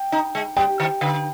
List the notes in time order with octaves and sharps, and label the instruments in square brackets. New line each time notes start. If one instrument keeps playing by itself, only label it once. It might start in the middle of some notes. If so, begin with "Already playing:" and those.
Already playing: [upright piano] G5
[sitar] D#4
G#3
[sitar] G3 [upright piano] G5
[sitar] D#3
D3